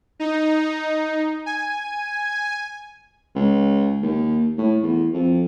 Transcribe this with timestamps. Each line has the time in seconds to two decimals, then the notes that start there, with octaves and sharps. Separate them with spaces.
0.20 D#4
1.46 G#5
3.35 C#2
4.02 D#2
4.58 A2
4.83 E2
5.13 F2